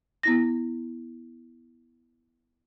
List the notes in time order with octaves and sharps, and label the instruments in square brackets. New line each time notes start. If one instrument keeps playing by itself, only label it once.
[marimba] B3 E4 A#6